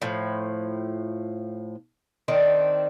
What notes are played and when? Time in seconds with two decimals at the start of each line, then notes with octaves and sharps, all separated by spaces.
0.02 A2 F3
2.28 D#3 C4 D4